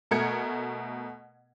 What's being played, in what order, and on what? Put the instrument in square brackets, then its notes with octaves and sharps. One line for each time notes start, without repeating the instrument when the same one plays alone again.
[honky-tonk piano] B2 A3 A#4 G#6 C#7